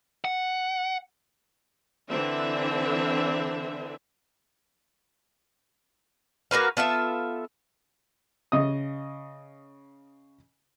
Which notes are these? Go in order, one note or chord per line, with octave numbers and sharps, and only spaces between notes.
F#5
D3 E3 C4 D4 E5
A#3 F#4 B4 F5
B3 F4 A4 E5
C#3 D#5 D#6